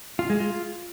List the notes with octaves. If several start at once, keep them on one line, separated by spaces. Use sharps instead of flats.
F4
G#3
F4